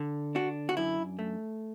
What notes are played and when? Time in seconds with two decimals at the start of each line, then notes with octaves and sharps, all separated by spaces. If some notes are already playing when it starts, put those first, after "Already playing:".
Already playing: D3
0.35 D4 F#4
0.69 F#4
0.77 F#2 E4
1.19 A3